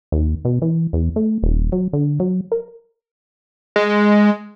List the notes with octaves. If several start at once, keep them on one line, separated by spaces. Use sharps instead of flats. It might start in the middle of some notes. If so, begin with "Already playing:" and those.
D#2
B2
E3
E2
A3
D#1
F#3
D3
F#3
A#4
G#3